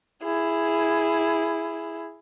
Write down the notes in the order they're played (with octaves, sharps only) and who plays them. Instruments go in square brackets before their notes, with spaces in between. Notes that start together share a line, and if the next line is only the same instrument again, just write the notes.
[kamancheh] E4 G#4